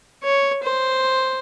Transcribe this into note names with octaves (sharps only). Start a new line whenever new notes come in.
C#5
C5